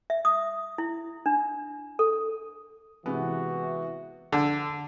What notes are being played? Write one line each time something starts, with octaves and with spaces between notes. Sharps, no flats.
E5
D#6
E4
D4
A4
C3 E3 G#3 B3 F#4
D3